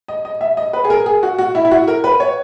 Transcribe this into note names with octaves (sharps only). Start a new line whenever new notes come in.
D#5
D#5
E5
D#5
B4
G#4
A#4
G#4
F#4
F#4
E4
E4
F#4
A#4
B4
C#5